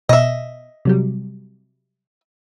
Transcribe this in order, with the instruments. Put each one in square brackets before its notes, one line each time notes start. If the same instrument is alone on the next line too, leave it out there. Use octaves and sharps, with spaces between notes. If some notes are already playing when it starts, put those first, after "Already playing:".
[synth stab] B2 [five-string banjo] D#5 E5
[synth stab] C3 F#3 G3